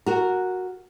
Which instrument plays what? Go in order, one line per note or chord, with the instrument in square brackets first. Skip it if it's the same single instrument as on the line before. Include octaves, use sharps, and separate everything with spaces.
[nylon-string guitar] F#4 A#4